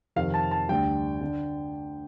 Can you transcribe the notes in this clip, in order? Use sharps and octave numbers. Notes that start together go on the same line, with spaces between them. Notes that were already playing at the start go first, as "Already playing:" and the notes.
F2 C3 D#3 F5
A5
A5
D2 D3 G3 G5
D3